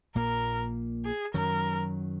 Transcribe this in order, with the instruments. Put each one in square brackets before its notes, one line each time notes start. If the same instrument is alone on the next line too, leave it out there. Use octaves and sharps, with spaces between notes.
[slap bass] A#1 A#2 A#3 [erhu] A#4
[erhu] G#4
[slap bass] F#2 D#3 F#3 [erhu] A#4